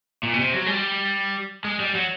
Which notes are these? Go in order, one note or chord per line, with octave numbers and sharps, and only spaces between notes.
A#2
B2
C3
F#3
G#3
G3
G#3
G3
F#3